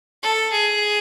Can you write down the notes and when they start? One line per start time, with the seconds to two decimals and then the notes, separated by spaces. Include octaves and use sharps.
0.23 A4
0.52 G#4